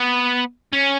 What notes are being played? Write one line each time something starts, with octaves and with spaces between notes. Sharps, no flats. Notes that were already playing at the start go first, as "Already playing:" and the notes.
Already playing: B3
C#4